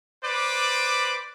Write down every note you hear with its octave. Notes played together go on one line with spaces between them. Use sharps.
B4 C5 D5 D6